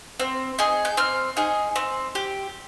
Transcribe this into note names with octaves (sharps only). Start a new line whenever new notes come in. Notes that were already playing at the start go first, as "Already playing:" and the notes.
C4
D#4 G#4
G6
C4 F6
D#4 G#4
C4
G4